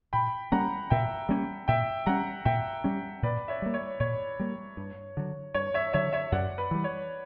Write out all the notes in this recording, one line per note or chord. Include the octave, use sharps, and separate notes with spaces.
A#2 G5 B5
G3 A#3 C#4 F#5 A#5
A#2 E5 G5
G3 A#3 C#4
A#2 E5 G5
G3 C#4 F#5 A#5
A#2 E5 G5
G3 C#4
A#2 B4 D5
C#5 E5
G3 A#3
C#5
A#2 C#5
G3 A#3
G2
D3 F#3
G2 C#5
C#5 E5
D3 F#3 C#5 E5
C#5 E5
F#2 D5 F#5
B4
E3 G3
C#5